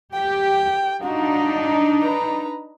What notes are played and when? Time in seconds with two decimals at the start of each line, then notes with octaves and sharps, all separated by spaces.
0.13 G4 G5
1.02 D4 D#4 F4 F#4
2.02 B4 A#5